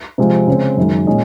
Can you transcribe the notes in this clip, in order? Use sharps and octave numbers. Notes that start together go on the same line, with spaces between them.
C3 F3 G#3 C4 F4
C#3 G#3 C4
F#2 D#3 G#3
A#2 G#3 C#4 G#4 D#5